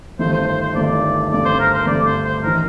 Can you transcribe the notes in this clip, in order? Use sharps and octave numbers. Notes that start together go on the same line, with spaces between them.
G1 G2 D#3 A3 C5
C5
C5
C5
G1 G2 D#3 A3 D5
G2 D3 A3 D5
C5
A#4
C5
G2 D3 A3 D5
C5
C5
A1 D#3 A#4